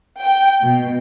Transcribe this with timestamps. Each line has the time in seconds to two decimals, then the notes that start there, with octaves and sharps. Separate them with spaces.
0.21 G5
0.64 B2